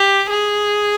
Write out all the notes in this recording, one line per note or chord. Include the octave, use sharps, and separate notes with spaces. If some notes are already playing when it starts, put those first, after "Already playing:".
Already playing: G4
G#4